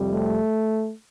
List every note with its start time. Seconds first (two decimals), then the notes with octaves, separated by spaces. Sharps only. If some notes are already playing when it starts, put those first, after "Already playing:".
Already playing: F2 C3 G3
0.12 A3